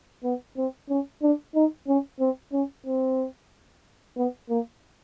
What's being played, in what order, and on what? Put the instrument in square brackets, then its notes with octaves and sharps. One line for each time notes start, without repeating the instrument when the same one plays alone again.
[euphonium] B3
C4
C#4
D4
D#4
C#4
C4
C#4
C4
B3
A#3